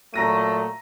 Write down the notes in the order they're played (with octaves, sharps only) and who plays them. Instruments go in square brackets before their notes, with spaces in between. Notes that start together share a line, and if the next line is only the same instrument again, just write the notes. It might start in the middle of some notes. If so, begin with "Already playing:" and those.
[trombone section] A#2 F#3 A3 [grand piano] A#5 A#6 D#7